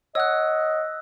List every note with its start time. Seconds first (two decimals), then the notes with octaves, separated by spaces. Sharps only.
0.15 C#5 D#5 F#5 E6 F#6